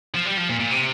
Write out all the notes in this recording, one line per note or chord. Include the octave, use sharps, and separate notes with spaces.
F3
G3
F3
A#2
A#2
C3